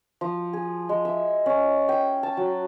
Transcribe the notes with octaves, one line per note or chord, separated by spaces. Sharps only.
F3
G#4
G#3
E5
C#4
G5
A5
F#3